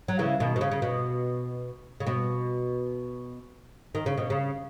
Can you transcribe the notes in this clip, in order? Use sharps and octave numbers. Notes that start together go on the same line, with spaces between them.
F#3
C#3 E3
B2 D#3
B2
C#3
C#3
B2
C#3
B2
D#3
C#3
B2
C#3